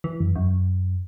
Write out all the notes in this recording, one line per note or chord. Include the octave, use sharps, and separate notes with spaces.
E3
F#2
F#2